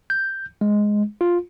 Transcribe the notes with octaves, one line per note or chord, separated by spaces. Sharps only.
G6
G#3
F4